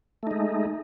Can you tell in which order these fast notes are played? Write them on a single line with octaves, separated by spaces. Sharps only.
A3 D#4 G#3